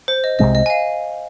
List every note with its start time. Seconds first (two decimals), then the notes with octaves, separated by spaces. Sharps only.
0.08 C5
0.24 D#5
0.39 C2 C3 G#3 C4 D#5
0.55 D#5
0.66 G#5
0.70 F5